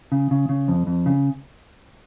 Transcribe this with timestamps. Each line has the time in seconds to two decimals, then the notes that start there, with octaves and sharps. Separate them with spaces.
0.12 C#3
0.31 C#3
0.49 C#3
0.68 F2
0.87 F2
1.06 C#3